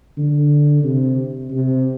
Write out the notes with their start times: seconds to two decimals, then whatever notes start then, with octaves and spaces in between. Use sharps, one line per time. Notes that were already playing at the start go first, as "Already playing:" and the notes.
0.18 D3
0.83 C3
1.50 C3